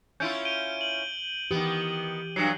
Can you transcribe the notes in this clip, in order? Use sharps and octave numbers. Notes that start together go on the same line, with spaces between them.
C#4 E4 F4 G6 D7
D7 D#7 G7
F#7
D#3 E3 B3 G4
G2 F#3 C7